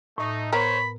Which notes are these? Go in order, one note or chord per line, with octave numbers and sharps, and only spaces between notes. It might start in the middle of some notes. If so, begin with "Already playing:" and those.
A2 A3 D#4
B3 A#4 C5 C#5 B5